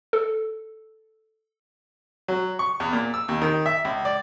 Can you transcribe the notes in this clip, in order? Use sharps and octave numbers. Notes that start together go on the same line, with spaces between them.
A4
F#3
C#6
E2
A#2
E6
D#2
D#3
E5
C#2
D5